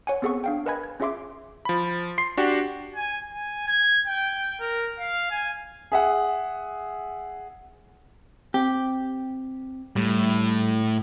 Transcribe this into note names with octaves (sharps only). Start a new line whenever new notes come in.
C#5 F#5 G#5
B3 C4 G#4 A4 F#5 C#6
D4 F5 G5
A#4 B4 D#5 G#5 B5 G#6
G#6
C#4 F4 G#4 E5 C6 D6
F3 B5
C6 C7
D4 F#4 G4
G#5
G#5
G#6
G5
A#4
F5
G#5
G#4 E5 F#5
C4 G4
A2 G3